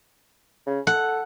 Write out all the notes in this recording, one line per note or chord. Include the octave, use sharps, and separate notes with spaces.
C#3
A4 F#5